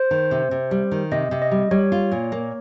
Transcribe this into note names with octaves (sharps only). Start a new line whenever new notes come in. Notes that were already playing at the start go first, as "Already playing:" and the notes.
Already playing: C5
D#3
C3
C3
G3
D#3
C3 D#5
C3
D#5
G3
G3 C#5
F4
A#2
A#3